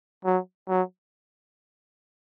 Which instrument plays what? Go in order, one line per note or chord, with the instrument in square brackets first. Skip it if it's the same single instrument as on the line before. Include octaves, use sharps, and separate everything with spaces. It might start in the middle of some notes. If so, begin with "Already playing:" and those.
[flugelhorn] F#3
F#3